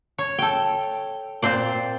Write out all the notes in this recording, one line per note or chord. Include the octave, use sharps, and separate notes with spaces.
C#5
A4 G5
A#2 C4 C5 D5